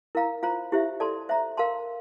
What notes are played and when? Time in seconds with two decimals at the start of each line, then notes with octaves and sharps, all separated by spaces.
0.15 E4 A#4 F5 A#5
0.43 F4 C5 F5 A#5
0.72 E4 G4 C5 E5
1.00 A4 D5 A5 C6
1.29 C5 E5 A#5
1.57 A#4 F5 A5 C6